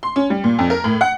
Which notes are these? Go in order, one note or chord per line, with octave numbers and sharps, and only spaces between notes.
C6
C#4
G3
A#2
F2
A#4
A2
F#5